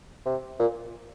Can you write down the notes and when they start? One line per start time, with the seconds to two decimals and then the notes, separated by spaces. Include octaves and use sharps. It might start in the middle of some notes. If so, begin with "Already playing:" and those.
0.25 C3
0.59 A#2